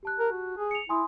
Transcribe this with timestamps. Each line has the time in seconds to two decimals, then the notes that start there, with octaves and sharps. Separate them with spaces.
0.03 G4 A5 F#6
0.20 A#4
0.32 F#4
0.58 G#4
0.71 C#7 F7
0.89 E4 G#5 C6 D#6